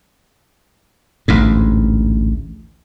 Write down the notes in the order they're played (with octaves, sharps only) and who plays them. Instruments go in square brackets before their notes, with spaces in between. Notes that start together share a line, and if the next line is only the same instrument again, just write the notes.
[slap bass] A1 D2 G#2